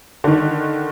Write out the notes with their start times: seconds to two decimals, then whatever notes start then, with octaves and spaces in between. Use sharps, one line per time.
0.24 D3 D#3